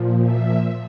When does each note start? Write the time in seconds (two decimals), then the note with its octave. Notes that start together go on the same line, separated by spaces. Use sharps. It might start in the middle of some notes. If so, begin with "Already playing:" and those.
Already playing: A#2 F3
0.23 E5